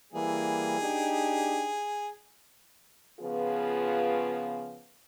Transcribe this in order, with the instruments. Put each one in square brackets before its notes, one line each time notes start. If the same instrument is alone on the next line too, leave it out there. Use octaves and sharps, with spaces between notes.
[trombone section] E3 G3 A#3 [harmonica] G#4
[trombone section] D4 D#4 G4
[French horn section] C#3 F3 B3 F4 G#4 B4